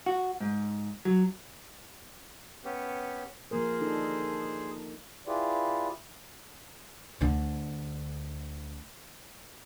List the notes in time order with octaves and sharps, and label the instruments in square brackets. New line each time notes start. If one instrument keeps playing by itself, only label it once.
[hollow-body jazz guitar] F#4
G#2
F#3
[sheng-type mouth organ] B3 C#4 G4
[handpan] F3 A#3 A#4 [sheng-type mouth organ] G#4 C5
[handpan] D4 D#4 A4
[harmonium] E4 F4 G4 G#4 B4 D5
[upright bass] D2 D3